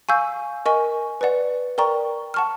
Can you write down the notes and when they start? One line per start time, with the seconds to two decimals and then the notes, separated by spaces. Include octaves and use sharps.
0.09 F5 G#5 C#6 E6 G6
0.66 A#4 D#5 G#5 C#6
1.21 B4 D5 F#5
1.78 A#4 D5 G5 A#5 C#6
2.34 F#5 A5 C#6 F6